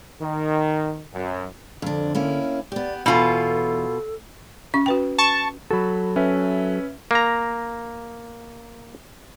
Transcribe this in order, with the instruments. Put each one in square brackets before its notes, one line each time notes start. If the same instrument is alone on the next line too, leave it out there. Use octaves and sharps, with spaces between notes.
[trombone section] D#3
F#2
[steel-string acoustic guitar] F2 D4 [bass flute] D3
[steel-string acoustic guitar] A#3 C#4 E4
[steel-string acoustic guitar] B3 G4 [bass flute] D5
[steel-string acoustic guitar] E2 G#5 [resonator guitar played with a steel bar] B2 F4 [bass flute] A4
[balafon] C#4 C#6
F#4 B4 G5
[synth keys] A5 C#6
[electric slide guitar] F#3 A4 [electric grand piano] F#4 B5
[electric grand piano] C#4 B4 E5
[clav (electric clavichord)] A#3 A#5